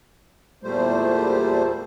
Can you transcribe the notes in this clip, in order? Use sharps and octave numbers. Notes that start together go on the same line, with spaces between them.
E2 A#2 G3 A3 C5